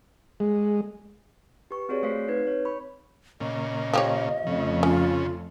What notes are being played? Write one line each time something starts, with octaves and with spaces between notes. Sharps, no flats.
G#3
G4 B4 C#6
C4 F#4 G#4 C#5 D5
A3 C5 C#5 F5 B6 C7
C4 D#4 B4 G#6
C#5
B5 C#6
A#2 C#3 D#5
F3 G4 C#5
F2 C#3 A3
C#4 F4